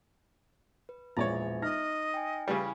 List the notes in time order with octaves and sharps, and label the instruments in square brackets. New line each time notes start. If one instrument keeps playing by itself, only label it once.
[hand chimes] B4
[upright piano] E1 A#1 [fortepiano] C#5 D5 A#5 [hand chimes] E5 A6
[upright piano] D#4 F6 A#6 [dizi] D#5
[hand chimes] G5 G#5
[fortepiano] C#3 E3 G3 [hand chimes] E4 G#5 B5